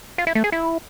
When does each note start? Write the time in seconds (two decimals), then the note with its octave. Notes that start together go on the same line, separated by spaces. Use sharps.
0.18 F4
0.27 E4
0.35 A3
0.44 G#4
0.52 E4